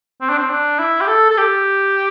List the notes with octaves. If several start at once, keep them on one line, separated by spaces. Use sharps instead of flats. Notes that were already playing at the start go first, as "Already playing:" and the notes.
C4
D4
C4
D4
E4
G4
A4
A4
G4